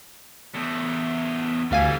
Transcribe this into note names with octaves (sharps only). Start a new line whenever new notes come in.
E2 A3
D2 E3 G3 F5 G#5